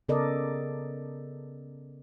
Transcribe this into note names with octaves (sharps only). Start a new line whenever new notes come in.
C#3 B3 A4 A#4 D5 D#5